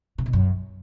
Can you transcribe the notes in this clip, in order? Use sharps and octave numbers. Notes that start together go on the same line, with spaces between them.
C3
B2
F#2